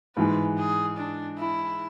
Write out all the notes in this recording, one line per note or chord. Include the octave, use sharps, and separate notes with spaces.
G#2 E3 G#3 B4
G#4
D4
E4